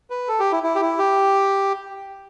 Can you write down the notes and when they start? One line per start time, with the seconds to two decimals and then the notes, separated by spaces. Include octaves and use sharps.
0.10 B4
0.28 A4
0.40 G4
0.52 E4
0.63 E4
0.75 G4
0.81 E4
0.99 G4